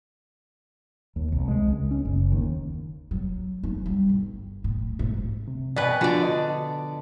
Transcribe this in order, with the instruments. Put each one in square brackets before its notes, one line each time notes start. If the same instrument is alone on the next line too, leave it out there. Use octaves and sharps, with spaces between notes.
[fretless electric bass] D#2
C2
G#3
C#2
C#4
F#1
D#2
[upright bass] F#3
D#4
G3
G1
A2
G#2
[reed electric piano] C3
[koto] B2 B4 [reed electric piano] D5 G5 G#5
[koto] D3 D5 [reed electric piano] F3 F4 F#4
[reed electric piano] D#5 A5